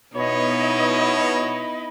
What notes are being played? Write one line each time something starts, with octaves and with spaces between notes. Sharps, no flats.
B2 B3 D#4 E4 C#5 D#5 B5